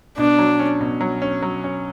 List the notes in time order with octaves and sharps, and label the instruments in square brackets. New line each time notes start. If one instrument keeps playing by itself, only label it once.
[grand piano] B2 [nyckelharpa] D4
[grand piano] F#3
C#4
B2
F#3
C#4
F#3
C#4